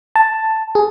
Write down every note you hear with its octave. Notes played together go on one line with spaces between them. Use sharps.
A5
G#4